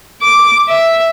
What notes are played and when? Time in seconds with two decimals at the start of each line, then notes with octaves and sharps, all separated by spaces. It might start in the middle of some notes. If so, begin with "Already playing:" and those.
0.22 D6
0.68 E5